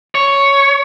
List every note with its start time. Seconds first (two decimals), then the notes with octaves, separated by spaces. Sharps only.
0.15 C#5